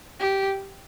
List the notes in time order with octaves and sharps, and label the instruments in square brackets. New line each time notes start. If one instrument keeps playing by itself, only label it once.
[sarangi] G4